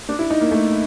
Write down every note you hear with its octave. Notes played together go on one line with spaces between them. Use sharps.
D4
E4
D#4
A#3
A3